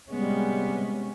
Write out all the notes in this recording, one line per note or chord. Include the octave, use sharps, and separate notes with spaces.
C3 G3 G#3 B3 C#4